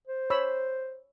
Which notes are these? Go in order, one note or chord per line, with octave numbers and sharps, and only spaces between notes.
C5
C#5 B5 E6